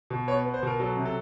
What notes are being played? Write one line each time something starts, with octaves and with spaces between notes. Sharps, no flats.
B2
B3 C#5
B3
C5
B2 A#4
F#3 A4
C3
A4